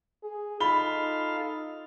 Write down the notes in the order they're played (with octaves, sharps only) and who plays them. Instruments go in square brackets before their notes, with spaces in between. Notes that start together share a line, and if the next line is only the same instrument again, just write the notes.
[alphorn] G#4
[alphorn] D#4 [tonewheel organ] F4 A4 F5 [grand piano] B5 G7